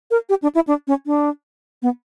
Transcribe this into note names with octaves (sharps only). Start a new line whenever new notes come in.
A#4
G4
D4
E4
D4
C#4
D4
B3